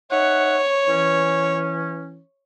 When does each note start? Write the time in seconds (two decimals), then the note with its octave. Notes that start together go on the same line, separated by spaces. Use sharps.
0.11 D#4 C#5 E5 F#5
0.88 E3 C#4